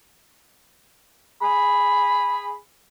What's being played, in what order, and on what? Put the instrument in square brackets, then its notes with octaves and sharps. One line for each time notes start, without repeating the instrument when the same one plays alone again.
[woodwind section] G#4 B5